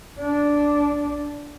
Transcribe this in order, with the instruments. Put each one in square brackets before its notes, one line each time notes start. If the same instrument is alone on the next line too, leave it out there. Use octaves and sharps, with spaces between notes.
[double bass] D4